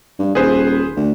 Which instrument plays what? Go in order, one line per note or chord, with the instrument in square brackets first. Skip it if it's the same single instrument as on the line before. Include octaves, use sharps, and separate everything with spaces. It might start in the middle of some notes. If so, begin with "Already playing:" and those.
[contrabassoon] G2
[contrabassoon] D#1 [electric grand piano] G#4 B4 C5
[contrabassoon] D2